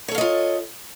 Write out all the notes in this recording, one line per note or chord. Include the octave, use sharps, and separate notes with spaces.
F4 A4 C#5 D#5 F5